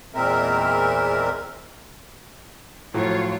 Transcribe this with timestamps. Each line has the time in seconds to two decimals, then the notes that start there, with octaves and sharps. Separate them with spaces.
0.15 E2 A#2 G#3 C4 A#4 E5
2.94 A2 F3 F#3 F4 C#5